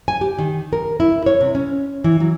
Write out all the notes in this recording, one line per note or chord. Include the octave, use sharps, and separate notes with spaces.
G#5
G4
D#3
A#4
E4
C#5
C3
C#4
E3
F#3